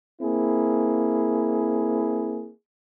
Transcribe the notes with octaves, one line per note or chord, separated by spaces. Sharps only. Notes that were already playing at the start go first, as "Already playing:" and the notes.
A#3 C4 E4 G#4